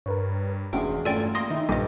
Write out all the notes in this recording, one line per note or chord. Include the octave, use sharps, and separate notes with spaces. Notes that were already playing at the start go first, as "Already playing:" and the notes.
G2 A#4 B4 C#5
F1 E2 G#3 C#4 D4 F#4 G#4 G5
G2 A3 C#4 F4 A4 D5 G5 G#5
A#3 C6 D#6 A#6
D#3 D#4 E4
A#1 G2 F3 A4 D#5 D6